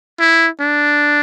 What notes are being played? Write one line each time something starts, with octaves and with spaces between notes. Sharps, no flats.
E4
D4